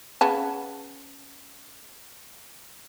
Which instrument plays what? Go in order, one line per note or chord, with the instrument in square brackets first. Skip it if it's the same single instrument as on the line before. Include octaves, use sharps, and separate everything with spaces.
[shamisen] C#3 B3 A5